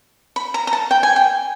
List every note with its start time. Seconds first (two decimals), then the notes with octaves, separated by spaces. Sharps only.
0.36 B5
0.54 A#5
0.67 A#5
0.73 A5
0.91 G5
1.03 G#5
1.16 G5